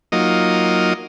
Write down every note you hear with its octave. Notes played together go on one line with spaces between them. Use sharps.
F#3 A#3 D#4 F4 D#5